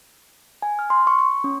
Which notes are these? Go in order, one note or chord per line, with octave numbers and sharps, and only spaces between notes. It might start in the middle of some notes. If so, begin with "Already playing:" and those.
G#5
F6
C6
C#6
C#6
C#4